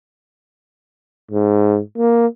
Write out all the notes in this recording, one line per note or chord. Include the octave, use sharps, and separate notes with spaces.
G#2
A#3